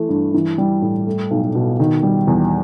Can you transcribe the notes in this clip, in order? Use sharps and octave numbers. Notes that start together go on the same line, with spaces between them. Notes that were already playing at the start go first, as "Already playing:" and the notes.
Already playing: E3 A3
G2
E3
G3
A2
A3
B1
B2
D#3
G3
E2